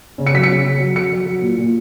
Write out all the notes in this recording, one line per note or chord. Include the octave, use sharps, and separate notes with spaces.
C#3
C#7
F#3 B6
C#7
C#3
C#3
F#3
F#3 C#7
F#3
F#3
A#2
A#2